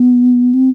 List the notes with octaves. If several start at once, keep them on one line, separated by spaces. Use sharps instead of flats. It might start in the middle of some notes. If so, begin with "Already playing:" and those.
Already playing: B3
C4